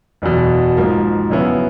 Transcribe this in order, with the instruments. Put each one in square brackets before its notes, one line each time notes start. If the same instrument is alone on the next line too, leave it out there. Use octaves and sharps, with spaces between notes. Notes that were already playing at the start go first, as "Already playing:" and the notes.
[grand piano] F#1 E2 B2
G#2 F3 A#3
F2 C#3 F#3 B3 E4